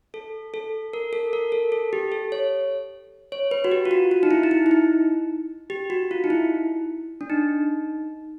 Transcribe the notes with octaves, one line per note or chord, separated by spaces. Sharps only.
A4
A4
A#4
A4
A#4
A4
A4
G4
A4
C#5
C#5
B4
F#4
G4
F4
F#4
F4
D#4
E4
D#4
E4
E4
D#4
G4
F#4
F4
D#4
E4
D4
D#4